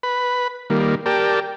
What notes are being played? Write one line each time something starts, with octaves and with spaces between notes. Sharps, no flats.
B4 B5
D#3 G3 A#3
G4 A#4 D5 G5 A5